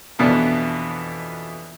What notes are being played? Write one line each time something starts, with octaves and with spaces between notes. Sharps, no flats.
F2 B2 E3 B3 D4